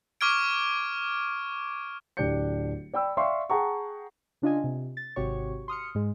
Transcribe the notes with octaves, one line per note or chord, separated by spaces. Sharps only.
C#6 D6 F6 G#6 D7
D1 D4 G4 G6 C#7
D5 G5 B5 E6
D5 E5 F5 G5 C6 C#6
G#4 F#5 G5 A5 A#5 C#6
C#3 D4 F4 D#5 G#5
C3
A6
G#1 C3 F#4 G4 C#5 C#6
C6 D#6 F6 C#7
G#2 G#3